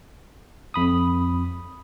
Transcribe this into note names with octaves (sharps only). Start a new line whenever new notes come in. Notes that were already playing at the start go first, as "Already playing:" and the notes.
F2 B5 D#6